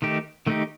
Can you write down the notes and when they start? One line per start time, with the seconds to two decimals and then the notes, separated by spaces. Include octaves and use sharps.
0.02 D#3 A3 D#4 G4
0.46 D#3 A3 D#4 G4